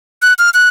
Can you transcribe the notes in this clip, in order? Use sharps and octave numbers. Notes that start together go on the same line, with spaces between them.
F#6
F6
F#6